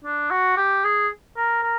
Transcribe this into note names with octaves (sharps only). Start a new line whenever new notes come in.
D4
F#4
G4
G#4
A#4
A#4